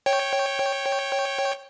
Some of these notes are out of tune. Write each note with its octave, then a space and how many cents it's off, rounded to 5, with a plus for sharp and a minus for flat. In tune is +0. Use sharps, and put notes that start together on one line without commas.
C#5 -10 G5 +0